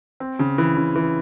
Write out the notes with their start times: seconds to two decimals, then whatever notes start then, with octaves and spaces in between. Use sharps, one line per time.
0.20 C4
0.39 C#3
0.58 E3
0.77 C#3
0.96 E3